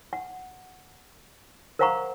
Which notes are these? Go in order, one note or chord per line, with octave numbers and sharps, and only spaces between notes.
F#5
A#4 C5 F5 F#5 A#5 C#6